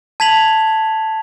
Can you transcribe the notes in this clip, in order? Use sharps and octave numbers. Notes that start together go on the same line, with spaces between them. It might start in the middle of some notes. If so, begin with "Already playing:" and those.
A5 G#6 B6 F7 F#7